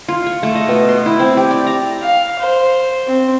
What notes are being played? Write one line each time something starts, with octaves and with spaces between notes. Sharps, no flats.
F4
C#6
A3
D#5
B2
C6
E4
C4
G4
D5
A#5
F5
C5
C4